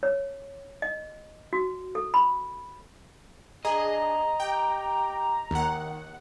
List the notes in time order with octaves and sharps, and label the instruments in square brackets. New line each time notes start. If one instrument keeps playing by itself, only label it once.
[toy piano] C#5
D#5
F#4
A4
B5
[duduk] D4 [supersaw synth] G#4 [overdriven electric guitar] D#5 [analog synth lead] A#5
[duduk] G4 [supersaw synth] G5
[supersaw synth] D#2 F#5 [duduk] D#3